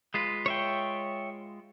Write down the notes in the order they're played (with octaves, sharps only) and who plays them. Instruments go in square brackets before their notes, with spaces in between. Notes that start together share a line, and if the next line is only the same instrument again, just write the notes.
[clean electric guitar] G#3 F4 B4
[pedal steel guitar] C#5 E5 G5